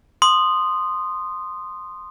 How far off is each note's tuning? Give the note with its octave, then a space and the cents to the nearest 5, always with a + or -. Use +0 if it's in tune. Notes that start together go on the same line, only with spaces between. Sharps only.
C6 +0 D#6 -15